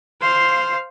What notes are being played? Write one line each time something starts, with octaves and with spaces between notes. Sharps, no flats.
C5 F5